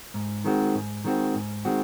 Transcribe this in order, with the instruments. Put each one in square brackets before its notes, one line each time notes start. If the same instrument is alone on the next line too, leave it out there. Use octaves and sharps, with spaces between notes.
[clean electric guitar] G#2
D#3 G#3 C4 F#4
G#2
D#3 G#3 C4 F#4
G#2
D#3 G#3 C4 F#4